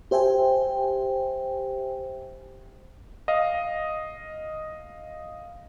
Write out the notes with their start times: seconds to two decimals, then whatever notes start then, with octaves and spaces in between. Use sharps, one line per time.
0.11 G4 C5 E5 G5 G#5
3.28 D#5 F5